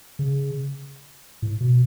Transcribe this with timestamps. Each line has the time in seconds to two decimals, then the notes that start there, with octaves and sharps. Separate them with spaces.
0.19 C#3
1.42 A2
1.61 B2